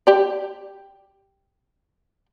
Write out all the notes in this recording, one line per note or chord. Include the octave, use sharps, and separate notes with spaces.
G4 D5